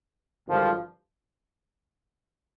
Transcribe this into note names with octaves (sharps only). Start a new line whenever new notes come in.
G#1 G2 D3 F3